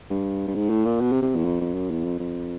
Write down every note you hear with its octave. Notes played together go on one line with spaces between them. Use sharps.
G2
G2
G#2
A2
A#2
B2
C3
C3
E2
F2
F2
F#2
E2
F2
F2